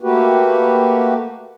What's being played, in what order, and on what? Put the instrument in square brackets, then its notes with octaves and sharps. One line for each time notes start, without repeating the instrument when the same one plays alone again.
[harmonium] A3 A#3 F#4 G4 B4